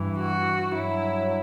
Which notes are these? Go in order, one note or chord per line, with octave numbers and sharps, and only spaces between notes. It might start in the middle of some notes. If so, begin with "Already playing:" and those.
Already playing: G2 E3
F#4
G2 F#3 E4